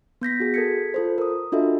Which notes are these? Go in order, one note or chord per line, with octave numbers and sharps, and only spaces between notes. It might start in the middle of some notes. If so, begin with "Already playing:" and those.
B3 G6 A#6 B6
F#4 G#4
A4 A#4 G#6 B6 C#7
F4 A4 C5
A#4 D#6
D4 F4 F#4 A4 D#5 E5